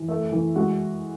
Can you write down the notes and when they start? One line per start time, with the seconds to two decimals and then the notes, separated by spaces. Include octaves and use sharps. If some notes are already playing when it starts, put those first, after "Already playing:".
Already playing: E3
0.08 A3
0.32 E3
0.56 G#3 F#4